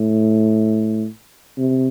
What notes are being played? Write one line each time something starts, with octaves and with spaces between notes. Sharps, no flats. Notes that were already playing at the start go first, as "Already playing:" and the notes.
Already playing: A2
C3